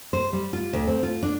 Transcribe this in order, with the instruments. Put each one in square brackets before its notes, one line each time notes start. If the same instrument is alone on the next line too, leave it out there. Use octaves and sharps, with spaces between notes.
[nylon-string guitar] C5
G3
F4
D2
C4
F4
D4